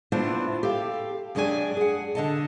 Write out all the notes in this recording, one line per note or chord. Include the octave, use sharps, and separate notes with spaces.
A3 B3 D4 E4 F4 C5
G4 A4 F5
F#2 G#3 D4 G4 A#4 G#5
G#4 F#5
D3 D#5 A5